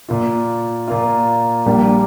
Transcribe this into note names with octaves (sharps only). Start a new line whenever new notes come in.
A#2 A#3 F4
A#2 A#3 F4
A#1 A#2 G3 A#3 D4